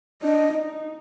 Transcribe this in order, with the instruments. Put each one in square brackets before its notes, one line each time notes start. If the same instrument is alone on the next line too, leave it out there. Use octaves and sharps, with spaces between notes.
[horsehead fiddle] D4 [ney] D#5
[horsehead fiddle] D#4